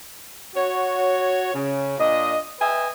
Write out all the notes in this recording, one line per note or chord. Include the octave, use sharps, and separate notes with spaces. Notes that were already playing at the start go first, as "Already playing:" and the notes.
F#4 C#5
C#3
A#2 D4 D#5
B4 D#5 E5 G5 G#5